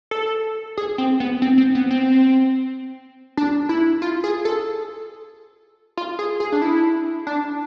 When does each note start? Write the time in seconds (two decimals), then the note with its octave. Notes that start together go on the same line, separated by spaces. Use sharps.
0.11 A4
0.77 G#4
0.98 C4
1.20 B3
1.42 C4
1.58 C4
1.75 B3
1.90 C4
3.37 D4
3.69 E4
4.02 F4
4.24 G#4
4.45 A4
5.97 F4
6.19 G#4
6.40 G#4
6.52 D4
6.62 E4
7.27 D4